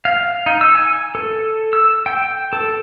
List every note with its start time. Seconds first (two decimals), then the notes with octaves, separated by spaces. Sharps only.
0.05 F5
0.46 D#4
0.61 E6
0.75 G#5
1.15 A4
1.73 E6
2.06 G5
2.53 A4